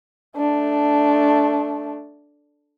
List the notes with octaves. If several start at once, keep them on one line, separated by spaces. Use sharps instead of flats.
A3 D4